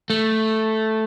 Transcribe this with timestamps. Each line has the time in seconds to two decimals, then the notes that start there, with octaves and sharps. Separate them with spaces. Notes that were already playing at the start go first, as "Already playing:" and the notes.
0.10 A3